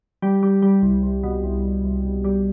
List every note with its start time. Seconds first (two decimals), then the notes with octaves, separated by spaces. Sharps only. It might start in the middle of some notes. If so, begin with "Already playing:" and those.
0.22 G3
0.43 G3
0.62 G3
0.82 C2
1.03 C2
1.23 B2
1.44 C2
1.64 C2
1.84 C2
2.04 C2
2.24 G3